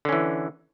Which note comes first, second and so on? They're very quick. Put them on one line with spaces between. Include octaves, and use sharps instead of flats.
D3 C#4 E3